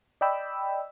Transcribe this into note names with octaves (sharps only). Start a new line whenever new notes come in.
D5 D#5 G5 B5 E6